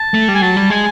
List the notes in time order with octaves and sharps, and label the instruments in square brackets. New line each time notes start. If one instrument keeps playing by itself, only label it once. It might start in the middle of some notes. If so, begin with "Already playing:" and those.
Already playing: [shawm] A5
[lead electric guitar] A3
G3
[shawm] G#5
[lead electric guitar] F#3 [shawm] A5
[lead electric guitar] G3
[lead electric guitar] G#3 [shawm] G#5